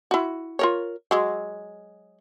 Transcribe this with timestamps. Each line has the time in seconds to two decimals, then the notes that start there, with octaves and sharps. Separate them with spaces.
0.11 E4 F#4
0.59 F4 A#4 C#5
1.11 F#3 G#3